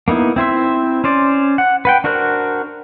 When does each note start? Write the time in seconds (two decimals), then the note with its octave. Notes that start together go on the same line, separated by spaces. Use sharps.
0.08 A#3 B3 D#4 E4
0.36 C4 E4 C5 E5
1.04 C#4 C5 D5
1.58 F#5
1.85 B4 F#5 G5
2.04 D4 F#4 A#4 C5 F#6